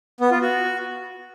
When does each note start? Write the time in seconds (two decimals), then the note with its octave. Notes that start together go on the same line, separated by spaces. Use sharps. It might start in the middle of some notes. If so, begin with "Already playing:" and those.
0.21 B3
0.31 F4
0.41 F#4